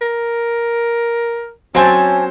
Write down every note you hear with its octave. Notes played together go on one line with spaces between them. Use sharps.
A#4
F#3 C4 C#4 C5 G#5 A5